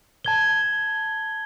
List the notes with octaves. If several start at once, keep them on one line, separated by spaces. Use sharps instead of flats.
A5 G#6 G7